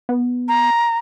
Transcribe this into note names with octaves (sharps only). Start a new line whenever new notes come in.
B3
A#5